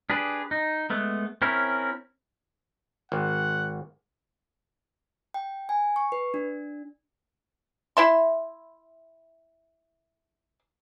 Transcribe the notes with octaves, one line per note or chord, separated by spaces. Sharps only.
D4 G4 G#4 B4
D#4
G#3 A3 B3
C4 C#4 E4 A#4 C#5
G#1 F#5
G5
G#5
C#6
B4
D4
E4 E5 C6